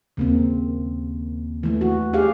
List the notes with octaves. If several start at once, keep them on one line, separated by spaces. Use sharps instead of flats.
D#2 C#3 A#3 C4
E3 A3
F#4
G4 G#4 F5